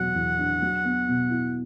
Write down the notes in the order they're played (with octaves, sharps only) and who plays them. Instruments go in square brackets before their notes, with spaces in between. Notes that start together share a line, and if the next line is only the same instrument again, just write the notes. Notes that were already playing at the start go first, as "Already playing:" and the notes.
Already playing: [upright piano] E2 B2 F#3 [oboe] F#5
[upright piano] E2
D4
F#3
B3
B2
E4